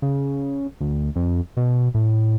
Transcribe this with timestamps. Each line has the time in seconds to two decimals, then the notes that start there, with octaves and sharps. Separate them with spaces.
0.02 C#3
0.80 D2
1.16 F2
1.57 B2
1.94 A2